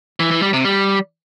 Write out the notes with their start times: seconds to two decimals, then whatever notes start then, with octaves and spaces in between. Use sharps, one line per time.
0.20 E3
0.31 E3
0.42 G3
0.53 C3
0.65 G3